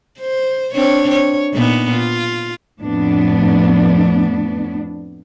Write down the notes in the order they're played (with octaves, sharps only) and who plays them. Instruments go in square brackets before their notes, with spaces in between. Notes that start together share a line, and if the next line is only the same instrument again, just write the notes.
[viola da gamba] C5
C4 D4 C#5
C#5
A#2 B3 D#4
F4
[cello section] F2 A2 B3 D4